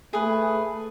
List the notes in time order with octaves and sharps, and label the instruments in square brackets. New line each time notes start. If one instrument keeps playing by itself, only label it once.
[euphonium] A3 [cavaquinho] G#4 B4